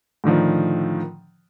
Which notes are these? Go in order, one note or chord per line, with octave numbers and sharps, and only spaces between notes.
A2 D3 D#3 F3